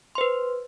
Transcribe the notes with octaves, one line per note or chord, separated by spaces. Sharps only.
B4 C5 C6